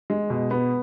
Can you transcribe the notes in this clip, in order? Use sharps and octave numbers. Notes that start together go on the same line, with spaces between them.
G#3
B2
B3